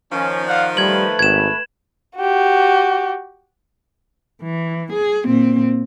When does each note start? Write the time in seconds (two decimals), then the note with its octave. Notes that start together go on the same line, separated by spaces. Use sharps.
0.12 D#3 F3 C#4
0.47 D5 F5 F#5
0.77 G3 A3 B4 G#6 F#7
1.19 G#1 G#6 E7
2.18 F#4 G4
4.42 E3
4.93 G#4
5.26 A#2 C4